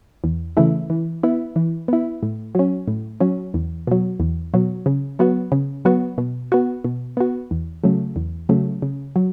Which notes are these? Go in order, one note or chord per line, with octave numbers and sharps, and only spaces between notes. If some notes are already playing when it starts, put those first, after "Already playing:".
E2
C#3 E3 A3 E4
E3
B3 E4
E3
B3 E4
A2
F#3 C#4
A2
F#3 C#4
E2
B2 F#3
E2
B2 F#3
C#3
F#3 B3 F#4
C#3
F#3 B3 F#4
B2
B3 F#4
B2
B3 F#4
E2
C#3 F#3 A3
E2
C#3 F#3 A3
C#3
F#3